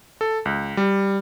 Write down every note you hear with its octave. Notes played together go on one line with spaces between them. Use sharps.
A4
C#2
G3